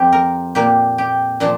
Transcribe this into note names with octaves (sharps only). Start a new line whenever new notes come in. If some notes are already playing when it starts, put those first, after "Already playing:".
Already playing: F2 F3 C4 G4
A#4
A#2 A#3 G4
G4
A#2 F3 D4